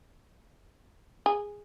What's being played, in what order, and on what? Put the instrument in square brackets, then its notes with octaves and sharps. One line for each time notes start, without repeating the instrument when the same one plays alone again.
[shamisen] G#4